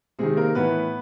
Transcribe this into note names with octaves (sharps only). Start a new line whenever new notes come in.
C3 D#3 G#3 G#4
A#3 A#4
A2 E3 B3 B4